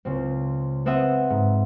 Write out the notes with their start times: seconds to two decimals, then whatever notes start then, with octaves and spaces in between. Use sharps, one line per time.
0.05 C#2 C#3 C4
0.86 B3 C4 D#5 E5 F#5
1.30 G#2